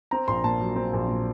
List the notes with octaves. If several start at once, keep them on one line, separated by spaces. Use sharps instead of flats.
C4 A#5
A#1 C6
A#2 A5
F#3
C4
A#1
A#2